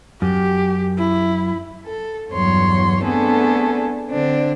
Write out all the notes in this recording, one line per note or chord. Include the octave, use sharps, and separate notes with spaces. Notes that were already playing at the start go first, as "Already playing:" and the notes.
F#2 G4
E4
A4
E2 G2 F#3 C#5 C6
A3 B3 C4 D4 G#4 A4
D3 C4 D4